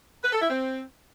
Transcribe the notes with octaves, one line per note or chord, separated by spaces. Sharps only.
B4
A4
E4
C4